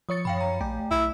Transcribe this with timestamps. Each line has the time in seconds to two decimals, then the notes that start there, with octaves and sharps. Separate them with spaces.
0.09 F3 C#5 D#6 A6 C#7
0.25 F#2 F5 G5 B5
0.41 A#5
0.61 A#1 A3 G5
0.91 B1 E4